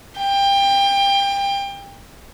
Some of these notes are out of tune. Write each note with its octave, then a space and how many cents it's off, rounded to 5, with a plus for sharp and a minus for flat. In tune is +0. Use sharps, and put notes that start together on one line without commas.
G5 +25